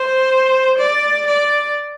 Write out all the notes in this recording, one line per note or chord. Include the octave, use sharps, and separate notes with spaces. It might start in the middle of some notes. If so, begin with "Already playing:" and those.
Already playing: C5
D5
D5